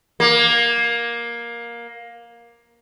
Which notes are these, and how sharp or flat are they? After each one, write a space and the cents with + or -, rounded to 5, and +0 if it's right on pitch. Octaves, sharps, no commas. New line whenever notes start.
A#3 +15